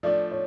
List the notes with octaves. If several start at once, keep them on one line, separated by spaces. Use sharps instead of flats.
F3 A3 D4 D5
C#5